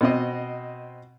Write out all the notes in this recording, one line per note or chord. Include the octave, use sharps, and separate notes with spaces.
B2 C4 D#5